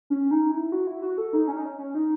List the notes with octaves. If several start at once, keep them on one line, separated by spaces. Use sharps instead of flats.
C#4
D#4
E4
F#4
E4
F#4
A4
D#4
C#4
D#4
C#4
C#4
D#4